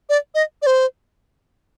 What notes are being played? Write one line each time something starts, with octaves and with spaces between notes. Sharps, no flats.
D5
D#5
D5
C5